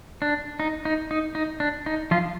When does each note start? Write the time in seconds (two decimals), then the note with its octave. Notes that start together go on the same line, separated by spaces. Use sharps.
0.22 D4
0.60 D#4
0.85 D#4
1.11 D#4
1.35 D#4
1.60 D4
1.86 D#4
2.11 F3 F4